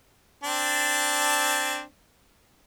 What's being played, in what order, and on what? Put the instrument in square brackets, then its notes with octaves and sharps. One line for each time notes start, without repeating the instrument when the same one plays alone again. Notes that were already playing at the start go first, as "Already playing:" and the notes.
[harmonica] C4 D4 A5